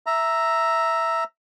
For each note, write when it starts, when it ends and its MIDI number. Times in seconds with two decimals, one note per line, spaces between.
0.06 1.24 76
0.06 1.24 82